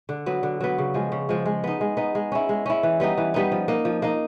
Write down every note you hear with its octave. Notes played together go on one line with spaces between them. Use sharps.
D3
F#3 B3
D3
F#3 B3
C#3
F3 G#3
C#3
F3 G#3
G#3
B3 D#4
G#3
B3 D#4
G#3
C#4 E4
G#3
C#4 E4
E3
G3 B3 D#4
E3
G3 B3 D#4
F3
A#3 D#4
F3
A#3 D#4